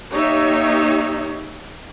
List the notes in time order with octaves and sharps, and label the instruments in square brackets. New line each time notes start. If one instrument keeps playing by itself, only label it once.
[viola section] A#3 D#4 G4 C#5 E5